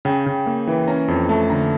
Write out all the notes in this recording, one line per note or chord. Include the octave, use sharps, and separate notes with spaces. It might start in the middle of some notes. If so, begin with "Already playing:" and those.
C#3 G5
C#3
A#3
E3
C#4 A#5
F2
A3 A5
D3 A#5